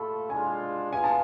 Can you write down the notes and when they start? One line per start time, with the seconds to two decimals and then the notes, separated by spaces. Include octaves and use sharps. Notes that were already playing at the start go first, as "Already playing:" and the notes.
Already playing: A3 F4 A4 A5 B5
0.30 G#3 D4 F4 G#5
0.92 B3 F4 G#4 F5 G#5
1.04 A5